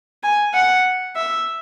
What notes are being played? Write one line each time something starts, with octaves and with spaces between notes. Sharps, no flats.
G#5
F#5
E5